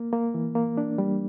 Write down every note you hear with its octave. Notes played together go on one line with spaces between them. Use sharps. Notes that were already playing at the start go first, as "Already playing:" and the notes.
Already playing: A#3
A#3
E3
A#3
D4
G3